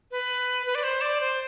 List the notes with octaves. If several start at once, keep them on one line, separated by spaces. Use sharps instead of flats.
B4
B4
D5
C5
D5
C5